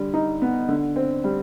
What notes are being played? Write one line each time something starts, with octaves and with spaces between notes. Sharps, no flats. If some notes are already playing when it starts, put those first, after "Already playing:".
Already playing: D3 G3
D#4
B3
D3
C4
G3